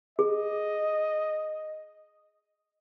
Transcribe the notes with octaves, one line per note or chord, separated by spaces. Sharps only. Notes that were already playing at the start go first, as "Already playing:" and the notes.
G#4 D#5